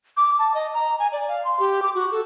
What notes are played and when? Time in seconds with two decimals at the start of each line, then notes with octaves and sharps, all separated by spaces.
0.17 D6
0.39 A5
0.54 D#5
0.74 A#5
0.99 G#5
1.12 D5
1.28 F5
1.45 C6
1.60 G4
1.82 D6
1.95 F#4
2.12 A4